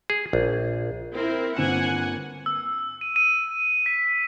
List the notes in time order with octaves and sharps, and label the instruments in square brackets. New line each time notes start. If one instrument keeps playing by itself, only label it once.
[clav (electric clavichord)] G#4
A#1
[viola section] C4 E4 A#4
[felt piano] G1 C4 E7 [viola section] A#3 F#5 G#5
[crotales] E6
D#7
D#7
B6